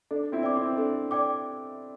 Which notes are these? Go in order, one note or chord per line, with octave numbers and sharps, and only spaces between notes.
D4 A4
C4 E4
D5 G5 D6
C4 E4
D4 A4
D5 G5 D6